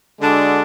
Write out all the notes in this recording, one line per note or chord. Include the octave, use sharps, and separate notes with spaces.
D3 G#3 D4 F#4 A4